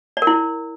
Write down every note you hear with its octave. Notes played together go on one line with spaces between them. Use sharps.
D5
A#4
E4